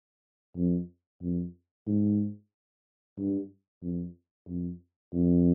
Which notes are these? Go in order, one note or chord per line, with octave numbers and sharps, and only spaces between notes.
F2
F2
G#2
G2
F2
F2
F2